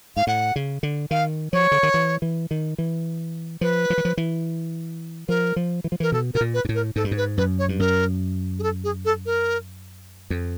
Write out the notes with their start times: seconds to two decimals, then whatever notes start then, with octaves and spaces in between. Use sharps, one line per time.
0.16 G#2 F5
0.27 A2 F#5
0.56 C#3
0.83 D3
1.11 D#3 F5
1.53 F3 C#5
1.72 D3
1.83 D#3
1.94 E3
2.22 E3
2.51 D#3
2.78 E3
3.61 F3 B4
3.90 F3
3.98 E3
4.05 F3
4.17 E3
5.28 F3 A#4
5.56 F3
5.84 E3
5.92 F3
6.00 E3 A#4
6.12 B2 A4
6.34 B2 A#4
6.41 A#2
6.54 B4
6.65 G#2
6.69 A2
6.75 A#4
6.96 G#2 A4
7.04 G2
7.11 G#2
7.17 B4
7.37 F#2 B4
7.59 C#5
7.69 G2
7.79 F#2 A#4
8.59 G#4
8.63 A4
8.84 G#4
9.05 A4
9.26 A#4
10.30 F2